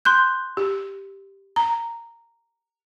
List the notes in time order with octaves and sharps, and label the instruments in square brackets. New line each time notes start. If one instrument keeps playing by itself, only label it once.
[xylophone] C6 F#6 G6
[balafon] G4
A#5